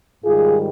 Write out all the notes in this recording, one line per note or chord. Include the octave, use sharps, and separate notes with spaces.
G#2 D#3 G3 F4 G#4